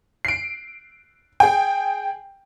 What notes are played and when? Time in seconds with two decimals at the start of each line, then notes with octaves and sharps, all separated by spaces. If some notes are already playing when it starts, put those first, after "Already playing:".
0.25 C7 D7
1.40 G#4 G5